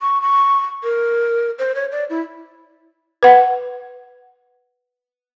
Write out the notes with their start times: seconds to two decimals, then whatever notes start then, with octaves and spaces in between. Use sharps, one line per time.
0.01 C#6
0.22 C#6
0.83 A#4
1.59 C5
1.75 C#5
1.92 D5
2.10 E4
3.23 B4 F#5